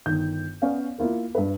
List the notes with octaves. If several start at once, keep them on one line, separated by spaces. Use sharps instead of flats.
G1 D#3 G6
B3 C#4 D5 F5
A#3 E4 F4 A#4
G2 B4